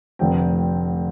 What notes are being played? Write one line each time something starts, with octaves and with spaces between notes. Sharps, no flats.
F1 F2 D3 A3 C4 G5